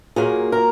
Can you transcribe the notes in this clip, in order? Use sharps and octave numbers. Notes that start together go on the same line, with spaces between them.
A#2 F#3 A#3 G#4
A#4